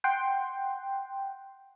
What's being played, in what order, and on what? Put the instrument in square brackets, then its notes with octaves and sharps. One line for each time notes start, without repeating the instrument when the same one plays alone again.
[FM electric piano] F#5 G5 C6